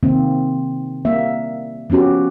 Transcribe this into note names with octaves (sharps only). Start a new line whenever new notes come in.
C3 D#3 A#3 C4
G3 A#3 E5
F3 B3 C#4 F#4 G4